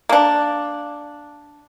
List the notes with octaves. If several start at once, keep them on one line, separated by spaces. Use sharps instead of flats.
A#3 D4